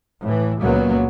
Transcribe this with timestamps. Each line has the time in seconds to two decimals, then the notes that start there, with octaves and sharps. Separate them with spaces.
0.23 A2 E3
0.61 C#2 F#2 A#2 F#3 A#3 B3